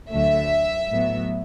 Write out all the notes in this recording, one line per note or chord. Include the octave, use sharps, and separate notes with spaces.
D2 D3 F#3 A3 E5
A2 F#3 B3